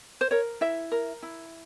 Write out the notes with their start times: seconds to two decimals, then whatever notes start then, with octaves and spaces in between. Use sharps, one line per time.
0.21 C5
0.31 A#4 C#5
0.61 E4 E5
0.91 A#4
1.22 E4